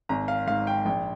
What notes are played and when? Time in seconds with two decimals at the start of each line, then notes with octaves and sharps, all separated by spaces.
0.09 G#1 A#5
0.28 F5
0.47 G#2 F5
0.67 G5
0.85 A#1 G5